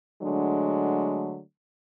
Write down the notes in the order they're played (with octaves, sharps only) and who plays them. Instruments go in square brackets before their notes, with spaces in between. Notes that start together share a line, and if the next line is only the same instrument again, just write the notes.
[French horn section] D3 F#3 G#3 A3 D4